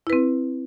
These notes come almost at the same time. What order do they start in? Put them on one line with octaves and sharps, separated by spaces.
E4 B4 C4